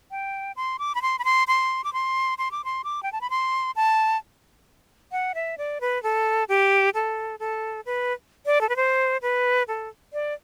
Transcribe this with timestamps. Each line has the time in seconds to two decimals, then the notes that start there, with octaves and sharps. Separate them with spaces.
0.11 G5
0.56 C6
0.79 D6
0.95 B5
1.02 C6
1.19 B5
1.25 C6
1.48 C6
1.84 D6
1.93 C6
2.38 C6
2.51 D6
2.65 C6
2.84 D6
3.03 G5
3.13 A5
3.21 B5
3.30 C6
3.76 A5
5.12 F#5
5.35 E5
5.58 D5
5.81 B4
6.03 A4
6.49 G4
6.94 A4
7.40 A4
7.86 B4
8.46 D5
8.61 A4
8.69 B4
8.76 C5
9.22 B4
9.68 A4
10.13 D5